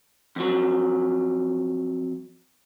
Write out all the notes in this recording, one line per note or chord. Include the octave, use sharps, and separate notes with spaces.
F2 F#3